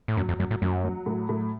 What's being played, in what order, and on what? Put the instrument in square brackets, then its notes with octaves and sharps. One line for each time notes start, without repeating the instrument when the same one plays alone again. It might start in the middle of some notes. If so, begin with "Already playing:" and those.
[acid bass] A2
[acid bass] F#2 [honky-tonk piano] F#3
[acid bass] F2
[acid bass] F#2 [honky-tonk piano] F#3
[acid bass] A2
[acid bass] F#2 [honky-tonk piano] F#3
[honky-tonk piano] F#3
A2
A2